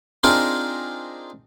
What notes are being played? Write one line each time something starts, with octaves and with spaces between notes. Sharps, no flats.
C4 D4 D#4 F4 G#4 A#4